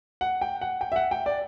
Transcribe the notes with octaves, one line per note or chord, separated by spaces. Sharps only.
F#5
G5
F#5
G5
E5
F#5
G5
D5